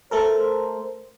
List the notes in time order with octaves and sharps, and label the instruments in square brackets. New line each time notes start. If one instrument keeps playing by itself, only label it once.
[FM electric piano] A3 A4 A#4 [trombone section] C5